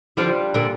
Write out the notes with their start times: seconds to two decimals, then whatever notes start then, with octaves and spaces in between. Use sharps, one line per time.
0.17 D3 F3 G3 D4 F4
0.54 A#2 D3